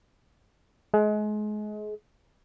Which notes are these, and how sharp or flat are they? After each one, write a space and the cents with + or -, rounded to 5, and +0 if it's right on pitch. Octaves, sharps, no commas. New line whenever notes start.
G#3 +30